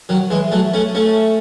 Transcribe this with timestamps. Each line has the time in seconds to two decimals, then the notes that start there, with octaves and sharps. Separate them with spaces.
0.09 D#3 F#3
0.30 E3 G#3
0.52 F#3 A3
0.73 A3 C#4
0.95 A3 C#4